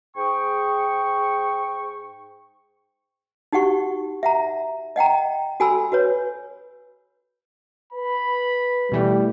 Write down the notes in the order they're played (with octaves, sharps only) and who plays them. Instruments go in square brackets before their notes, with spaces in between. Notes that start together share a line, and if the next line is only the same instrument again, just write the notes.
[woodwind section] G#2 G#4 G5 C#6
[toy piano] D#4 F#4 G4 F#5 C#6
E5 F#5 A#5
D#5 F#5 G5 A#5
F#4 A4 G#5 B5 C6 E6
F#4 B4 C#5
[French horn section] B4 [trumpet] B5
[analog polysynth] B2 E3 A3 [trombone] G3